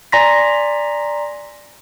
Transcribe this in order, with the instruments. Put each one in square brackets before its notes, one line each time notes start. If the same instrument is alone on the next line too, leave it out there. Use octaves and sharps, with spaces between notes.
[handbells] D5 G#5 A#5 C6 A#6 B6